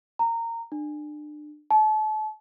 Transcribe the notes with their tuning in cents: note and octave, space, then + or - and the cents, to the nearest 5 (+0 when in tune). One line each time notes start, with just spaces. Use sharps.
A#5 -20
D4 +30
A5 -35